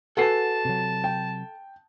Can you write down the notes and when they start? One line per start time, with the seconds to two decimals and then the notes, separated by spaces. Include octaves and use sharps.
0.17 F#4 A4 B4 F#5 G#5 A5 C7
0.65 C3 F#3
1.04 G5